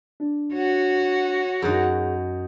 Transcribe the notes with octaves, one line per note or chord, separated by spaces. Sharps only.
D4
F#4 C#5 F#5
F#2 D#4 G#4 C#6